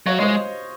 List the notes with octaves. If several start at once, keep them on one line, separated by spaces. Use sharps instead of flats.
F#3 C#5 F5
G#3 C5 D#5